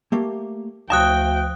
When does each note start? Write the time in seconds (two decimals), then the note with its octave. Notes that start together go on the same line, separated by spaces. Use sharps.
0.12 A3 A#3 G4
0.90 D2 F3 C#5 F5 G5 A5 D#6 F#6